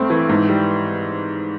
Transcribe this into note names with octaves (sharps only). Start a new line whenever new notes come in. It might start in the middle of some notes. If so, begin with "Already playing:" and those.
Already playing: G2 A3 C4
E3
G#2
G3